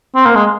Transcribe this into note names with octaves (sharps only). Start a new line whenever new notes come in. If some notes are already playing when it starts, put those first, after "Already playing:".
C4
A#3
G#3